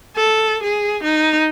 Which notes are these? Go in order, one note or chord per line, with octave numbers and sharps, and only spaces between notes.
A4
G#4
D#4